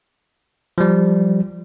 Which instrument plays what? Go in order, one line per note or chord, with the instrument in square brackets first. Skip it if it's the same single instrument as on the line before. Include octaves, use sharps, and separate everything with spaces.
[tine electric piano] F3 G3